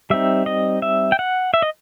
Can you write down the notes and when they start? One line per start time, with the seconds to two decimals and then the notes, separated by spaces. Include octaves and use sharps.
0.10 G3 C4 D#4 E5
0.46 D#5
0.82 E5
1.12 G5
1.19 F#5
1.54 E5
1.62 D#5